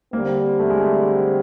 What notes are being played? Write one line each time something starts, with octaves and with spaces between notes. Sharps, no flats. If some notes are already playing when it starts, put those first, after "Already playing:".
D3 G3 A#3 C4
A3
G#3
A3